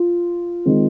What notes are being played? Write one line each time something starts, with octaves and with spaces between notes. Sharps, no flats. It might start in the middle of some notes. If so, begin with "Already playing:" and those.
Already playing: F4
D#3 G#3 C4